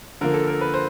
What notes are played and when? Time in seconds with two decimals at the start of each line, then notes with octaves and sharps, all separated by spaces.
0.21 D3 F3 A#3 A#4
0.34 A4
0.47 A#4
0.61 B4
0.74 C5